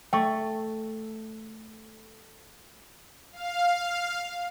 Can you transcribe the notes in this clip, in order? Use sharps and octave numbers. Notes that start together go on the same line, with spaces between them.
A3 G5 C#6
F5